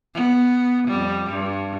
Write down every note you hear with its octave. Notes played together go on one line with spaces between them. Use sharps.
B3
F2 G3
G2